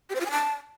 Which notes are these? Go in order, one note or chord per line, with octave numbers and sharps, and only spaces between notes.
G4
C5
F4
G#5
A5